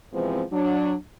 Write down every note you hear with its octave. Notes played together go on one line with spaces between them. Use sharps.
C3 E3 F3 G#3 B3 C4
F#3 D4